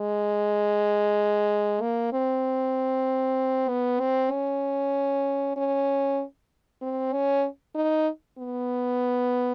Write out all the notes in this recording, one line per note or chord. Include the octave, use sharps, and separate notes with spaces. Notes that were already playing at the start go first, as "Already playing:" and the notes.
Already playing: G#3
A#3
C4
B3
C4
C#4
C#4
C4
C#4
D#4
B3